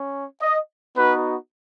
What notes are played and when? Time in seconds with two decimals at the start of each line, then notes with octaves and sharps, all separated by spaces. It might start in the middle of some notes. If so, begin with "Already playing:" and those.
Already playing: C#4
0.41 D#5
0.96 B3 D#4 F#4 B4